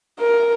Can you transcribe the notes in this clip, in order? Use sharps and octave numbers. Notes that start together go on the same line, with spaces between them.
A#4